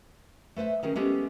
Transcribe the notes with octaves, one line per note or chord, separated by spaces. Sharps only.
A3 B4 C5 E5
D#3 C#4 G#4 A#4
G#3 B3 C#4 G4 A4